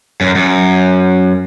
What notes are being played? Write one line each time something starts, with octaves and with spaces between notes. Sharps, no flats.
F#2
F#2